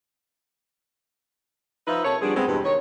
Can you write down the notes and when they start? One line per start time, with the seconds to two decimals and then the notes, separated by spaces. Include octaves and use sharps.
1.88 F3 D#4 F4 B4 E5
2.04 C3 A4 A#4 C#5
2.22 F3 G3 B3 C4 D4 G#4
2.36 G3 G#3 B3 C4
2.48 E2 G2 B2 C4 G4
2.65 D#3 C#5